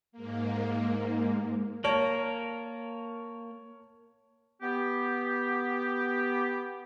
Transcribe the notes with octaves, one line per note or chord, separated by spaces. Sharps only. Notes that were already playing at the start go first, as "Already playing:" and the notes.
G#2 A#3
A#3 A#4 C#5 A5
B3 G4